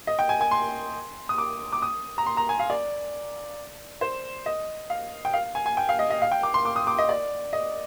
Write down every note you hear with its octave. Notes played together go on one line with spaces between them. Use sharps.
D#5
G5
G#5
G#5
C6
D#6
D6
D6
D#6
A#5
C6
A#5
G#5
F5
D5
C5
D#5
F5
G5
F5
G#5
G#5
G5
F5
D#5
D#5
F5
G5
D6
C6
D6
D#6
D6
D#5
D5
D#5